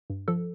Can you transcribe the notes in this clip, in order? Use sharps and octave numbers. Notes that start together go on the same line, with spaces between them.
G2
F3 A4